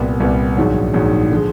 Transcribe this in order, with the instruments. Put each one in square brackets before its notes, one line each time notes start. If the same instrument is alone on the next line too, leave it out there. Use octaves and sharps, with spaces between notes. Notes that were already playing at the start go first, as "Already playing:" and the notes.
Already playing: [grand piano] C2 A#2 G3 B3
C2 A#2 G3 B3
A#1 G#2 D#3 F#3
A#1 G#2 D#3 F#3
D3 F3 G#3